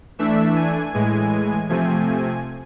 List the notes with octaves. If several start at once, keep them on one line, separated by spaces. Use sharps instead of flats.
E3 A3 D4 E5
G#5
A2 E3 G#3
C3 F3 A3 C4 G#5